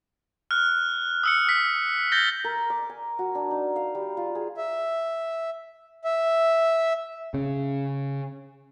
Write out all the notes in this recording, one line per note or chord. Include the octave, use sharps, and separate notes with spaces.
F6 F#6
D#6 E6 C#7
B6
G6 A6 A#6 G7
A#4
D6
G#5
F#4
D4
D#4
F5
G3
F4
G#4
E5
E5
C#3